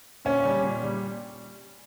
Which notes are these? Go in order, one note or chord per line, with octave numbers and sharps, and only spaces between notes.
A#2 C#4
G3
A#2
G3